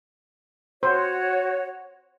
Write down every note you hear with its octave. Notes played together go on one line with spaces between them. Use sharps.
F#4 C5 C#5